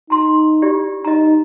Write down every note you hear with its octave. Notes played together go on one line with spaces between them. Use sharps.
D#4 A#5 C6
E4 G4 D5
D#4 D#5 A#5